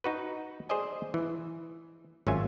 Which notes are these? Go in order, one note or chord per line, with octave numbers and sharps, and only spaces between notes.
D#4 F#4 B4
G#4 C5 D5 D#5 G#5
E3
G#1 F#3 C#4 F4 E5 G#5